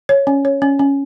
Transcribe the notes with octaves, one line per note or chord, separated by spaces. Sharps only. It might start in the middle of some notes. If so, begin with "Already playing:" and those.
C#5
C#4
C#5
C#4
C#4